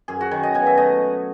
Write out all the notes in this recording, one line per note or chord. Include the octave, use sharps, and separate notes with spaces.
F#2 G#4
F#4
D#3 C#5
D#5
B2 G#5
E5
A3 D#5